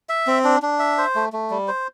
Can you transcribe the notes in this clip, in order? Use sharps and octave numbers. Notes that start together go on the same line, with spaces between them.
E5
C4
D4
D4
E5
C5
A3
A3
G3
C5